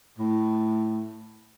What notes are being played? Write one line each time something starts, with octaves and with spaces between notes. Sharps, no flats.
A2